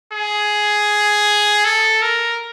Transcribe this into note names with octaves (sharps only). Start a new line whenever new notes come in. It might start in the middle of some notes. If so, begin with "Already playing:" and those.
G#4
A4
A#4